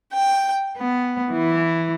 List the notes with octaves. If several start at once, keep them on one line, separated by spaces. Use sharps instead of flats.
G5
B3
E3